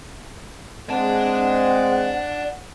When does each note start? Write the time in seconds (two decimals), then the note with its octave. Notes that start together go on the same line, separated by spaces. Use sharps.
0.90 G#3 C4 D5 F#5 A5